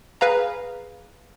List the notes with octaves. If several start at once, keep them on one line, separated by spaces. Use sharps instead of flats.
G#4 B4 F5 A#5